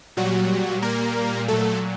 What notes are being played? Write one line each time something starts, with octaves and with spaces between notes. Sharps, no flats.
A#2 F#3 G3 F#4
A#3 A#4
A#2 F#3 A3 A4